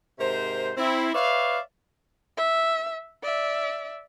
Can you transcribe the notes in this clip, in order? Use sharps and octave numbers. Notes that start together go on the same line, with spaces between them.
G#2 C3 A#4 C5
C4 E4
B4 C#5 D5 E5 F5
E5
D5 E5